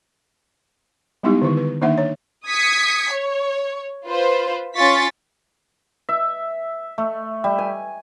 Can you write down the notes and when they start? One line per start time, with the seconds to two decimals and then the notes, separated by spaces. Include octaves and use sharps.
1.23 G3 G#3 B3 D#4 E4 G4
1.42 D3 D#3 E4
1.57 B4
1.81 D#3 A#3 D4 D#4 E5 F#5
1.98 C#5
2.47 D#6 G#6 B6 C#7
3.12 C#5
4.06 F4 B4 C5
4.76 C#4 F4 C#6 A6 B6
6.09 E5
6.98 A3
7.44 G3
7.59 G#5